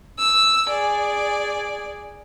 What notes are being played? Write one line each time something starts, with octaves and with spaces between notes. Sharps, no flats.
E6
G#4 D5